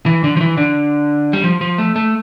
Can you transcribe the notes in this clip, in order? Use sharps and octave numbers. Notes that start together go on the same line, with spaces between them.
E3
D3
F3
E3
D3
G3
F3
F3
A3
A3